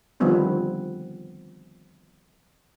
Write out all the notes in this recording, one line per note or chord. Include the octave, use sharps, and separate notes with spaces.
D3 D#3 F3 G3 B3 C4